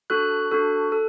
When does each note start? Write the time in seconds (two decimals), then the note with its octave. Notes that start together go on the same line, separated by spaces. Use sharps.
0.10 D4 F#4 A4 F#6
0.51 D4 F#4 A4
0.92 A4